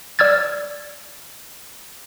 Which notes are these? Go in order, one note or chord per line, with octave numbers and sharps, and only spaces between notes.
D5 E6 F6 G#6 A6